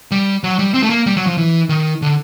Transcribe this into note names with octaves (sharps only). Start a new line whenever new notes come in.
G3
F#3
G3
C4
A3
A#3
G3
F#3
F3
E3
D#3
D3